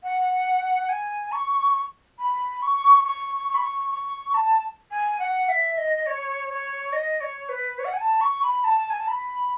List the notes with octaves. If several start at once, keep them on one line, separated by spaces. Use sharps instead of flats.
F#5
G#5
C#6
B5
C#6
C#6
C#6
B5
C#6
C#6
A5
G#5
F#5
E5
D#5
C#5
C#5
D#5
C#5
B4
C#5
F#5
G#5
A5
C#6
B5
A5
G#5
A5
B5